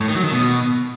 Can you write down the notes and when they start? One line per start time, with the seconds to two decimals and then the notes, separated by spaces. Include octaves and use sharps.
0.01 A2
0.08 D#3
0.16 F#3
0.24 D#3
0.32 B2